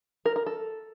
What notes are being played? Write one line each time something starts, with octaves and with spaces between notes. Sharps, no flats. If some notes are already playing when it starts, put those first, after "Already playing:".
A#4
A#4
A4